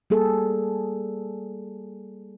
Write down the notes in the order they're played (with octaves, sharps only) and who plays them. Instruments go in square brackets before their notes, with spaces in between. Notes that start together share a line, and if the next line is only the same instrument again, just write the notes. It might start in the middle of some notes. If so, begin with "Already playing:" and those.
[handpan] G3 A#3 G#4 A4